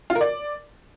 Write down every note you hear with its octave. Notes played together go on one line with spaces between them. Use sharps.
F4
A#4
D5